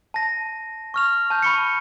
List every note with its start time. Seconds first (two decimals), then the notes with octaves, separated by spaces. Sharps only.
0.14 A5 A#6
0.94 C#6 F6 F7
1.30 A5 G6
1.43 B5 C#6 C#7